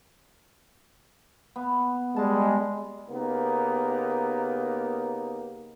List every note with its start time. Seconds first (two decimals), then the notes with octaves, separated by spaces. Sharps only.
1.56 B3
2.16 G3 G#3 A5
3.10 C#3 A#3 B3 D#4 G4 A#4